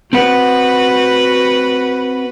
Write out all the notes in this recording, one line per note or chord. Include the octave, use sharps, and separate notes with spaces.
C4 F#4 B4 F#5